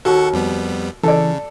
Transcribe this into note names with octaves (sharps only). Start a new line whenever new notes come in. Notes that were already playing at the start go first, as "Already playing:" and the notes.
D#2 F#4 A4 F#5 C#6
F2 G3 B3
C#3 E3 A4 D5